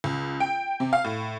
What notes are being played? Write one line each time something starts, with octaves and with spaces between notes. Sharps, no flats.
C#2
G5
C3
F5
A2